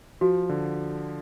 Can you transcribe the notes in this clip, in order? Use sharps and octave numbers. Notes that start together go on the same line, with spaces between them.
F3 F#4
D3